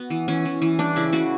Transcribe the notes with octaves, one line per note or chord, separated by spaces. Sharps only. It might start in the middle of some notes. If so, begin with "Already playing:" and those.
Already playing: B3 F#4
E3
E3 C#4
E3
E3
G3 D4
C#3 E4
C#3 F#4